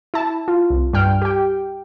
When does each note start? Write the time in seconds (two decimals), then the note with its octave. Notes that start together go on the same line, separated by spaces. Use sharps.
0.14 E4 A5
0.48 F4
0.70 C2
0.93 G2 G3 G5 F6
1.22 G4 G5